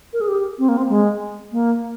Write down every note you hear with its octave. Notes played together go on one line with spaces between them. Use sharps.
A#4
G#4
G4
C4
A#3
C4
G#3
A#3